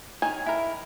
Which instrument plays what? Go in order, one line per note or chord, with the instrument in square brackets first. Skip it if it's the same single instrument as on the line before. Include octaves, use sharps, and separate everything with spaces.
[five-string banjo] D#3 C#5 G#5
[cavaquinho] E4 A#4